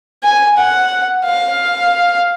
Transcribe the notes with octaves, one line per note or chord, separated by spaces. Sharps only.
G#5
F#5
F5